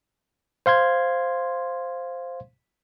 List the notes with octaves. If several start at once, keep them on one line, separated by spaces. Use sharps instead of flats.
C5 F5 C6 G#6